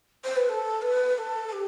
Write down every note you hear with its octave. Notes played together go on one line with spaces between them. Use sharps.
C5
B4
A4
B4
B4
A4
A4
G4